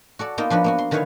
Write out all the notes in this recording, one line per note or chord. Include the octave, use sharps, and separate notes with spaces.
F#4 A4 D5
A#3 B3 D#4 F4 A#4
F3 D4 F#4 B4
A#3 B3 F#4
C6
D3 D#3 E4 B4 C#5 F5